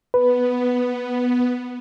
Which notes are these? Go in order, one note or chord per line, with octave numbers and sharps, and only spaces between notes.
B3 B4